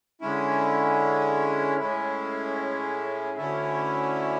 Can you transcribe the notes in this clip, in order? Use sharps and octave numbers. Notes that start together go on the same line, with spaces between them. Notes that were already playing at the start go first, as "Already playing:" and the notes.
D3 G#3 C#4 E4
A2 G#3 C#4 E4
D2 D3 A3 C#4 E4